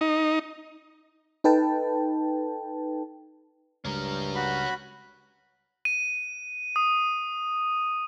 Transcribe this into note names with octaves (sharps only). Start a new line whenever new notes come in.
D#4
D#4 A4 B4 G5 A5
C#2 G2 C#4 A#4
F#4 B5
D#7
D#6